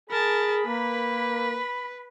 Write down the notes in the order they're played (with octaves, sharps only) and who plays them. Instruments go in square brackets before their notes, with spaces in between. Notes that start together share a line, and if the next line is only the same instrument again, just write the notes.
[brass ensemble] G#4 [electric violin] A#4 A5 [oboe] B5
[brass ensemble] A#3 [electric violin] B4